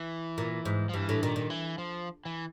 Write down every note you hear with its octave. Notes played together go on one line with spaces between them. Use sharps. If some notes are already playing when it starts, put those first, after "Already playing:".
Already playing: E3
A#2
G#2
F3
G2 E3
A2
A#2 D#3
A#2
E3
F3
E3